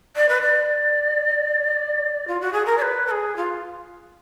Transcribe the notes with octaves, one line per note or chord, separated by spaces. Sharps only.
D5
B4
D5
F4
F#4
G#4
A#4
D5
B4
A#4
G#4
F4